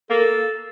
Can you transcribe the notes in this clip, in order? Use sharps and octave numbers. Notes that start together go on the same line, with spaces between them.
A#3 A4